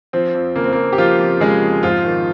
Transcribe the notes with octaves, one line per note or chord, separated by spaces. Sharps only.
F3 C4
F2
C#3 A#3
C4
F2 A#3
G4
F3 F4
F2
C#3 G#3 G#4
F2
G#2 F3 F4
D#3